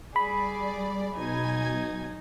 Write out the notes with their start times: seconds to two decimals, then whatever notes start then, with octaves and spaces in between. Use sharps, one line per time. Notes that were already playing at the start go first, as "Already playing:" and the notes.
0.16 G3 G#4 D5 B5
1.17 B2 F#3 D#4 G#5 G#6